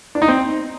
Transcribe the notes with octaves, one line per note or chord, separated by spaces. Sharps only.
D4
D#4
C4